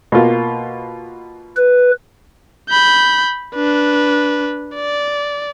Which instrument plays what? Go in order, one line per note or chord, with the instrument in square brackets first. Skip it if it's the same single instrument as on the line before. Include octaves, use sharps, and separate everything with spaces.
[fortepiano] B2 A#3 F4
[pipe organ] B4
[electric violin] B5 G6
D4 B4
D5